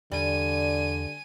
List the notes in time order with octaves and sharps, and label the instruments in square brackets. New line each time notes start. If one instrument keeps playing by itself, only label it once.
[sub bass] E2 [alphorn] D3 [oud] G3 [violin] G#5 D#7